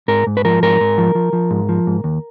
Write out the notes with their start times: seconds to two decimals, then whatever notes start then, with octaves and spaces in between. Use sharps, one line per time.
0.08 G#2 A#4
0.27 G#2
0.37 B4
0.45 F3 A#4
0.62 G#2 A#4
0.81 G#2
0.98 F3
1.15 F3
1.33 F3
1.51 G#2
1.69 F3
1.87 G#2
2.04 D#2